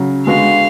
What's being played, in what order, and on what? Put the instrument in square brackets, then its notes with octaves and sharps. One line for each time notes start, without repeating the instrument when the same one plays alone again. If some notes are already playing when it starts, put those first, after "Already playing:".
Already playing: [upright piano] C#3 F#3
[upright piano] D3 G#3 B3 F#4 [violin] F5